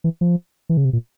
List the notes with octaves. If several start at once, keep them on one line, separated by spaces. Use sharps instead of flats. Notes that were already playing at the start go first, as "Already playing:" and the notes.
E3
F3
E3
C#3
C3
A#2